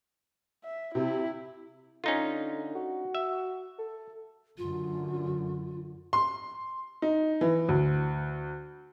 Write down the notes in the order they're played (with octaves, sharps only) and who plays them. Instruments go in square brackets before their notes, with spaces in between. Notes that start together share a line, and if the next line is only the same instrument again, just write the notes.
[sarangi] E5
[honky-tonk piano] C3 [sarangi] E4
[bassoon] D3 [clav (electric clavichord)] C#4 D#4 F4
[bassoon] F#4
[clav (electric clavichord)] E5
[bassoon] A4
[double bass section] F#2 D3 [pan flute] F4
[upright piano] C6
D#4
E3
D2